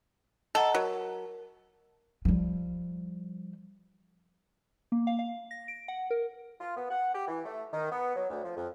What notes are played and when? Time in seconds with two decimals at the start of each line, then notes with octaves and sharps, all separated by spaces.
0.55 A4 D#5 F#5 A#5
0.75 F#3 A#4
2.25 F3 G3
4.92 A#3
5.07 F5
5.19 F5
5.51 A#6
5.68 D7
5.88 F#5
6.11 A#4
6.60 F4
6.77 B3
6.90 F#5
7.14 G4
7.28 E3
7.44 A3
7.72 D#3
7.90 B3
8.15 F#3
8.30 D2
8.44 F3
8.56 F2